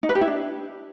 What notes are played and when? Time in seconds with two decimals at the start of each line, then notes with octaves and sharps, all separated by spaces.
0.03 D#4
0.09 B4
0.15 G4
0.21 E4
0.27 D4